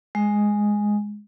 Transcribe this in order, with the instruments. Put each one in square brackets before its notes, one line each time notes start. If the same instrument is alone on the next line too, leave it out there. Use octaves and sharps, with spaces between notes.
[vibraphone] G#3